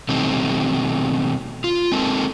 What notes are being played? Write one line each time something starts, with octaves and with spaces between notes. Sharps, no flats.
B2 D#3 F#3 G3 A3 C4
F4
G#3 C4 D#4 A4 A#4